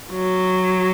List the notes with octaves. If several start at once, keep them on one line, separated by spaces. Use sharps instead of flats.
F#3